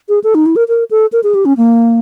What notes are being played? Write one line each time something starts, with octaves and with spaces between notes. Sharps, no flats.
G#4
A4
D#4
E4
A#4
A#4
A4
A#4
G#4
G4
C#4
A#3